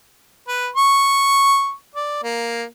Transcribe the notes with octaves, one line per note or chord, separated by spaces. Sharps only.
B4
C#6
D5
A#3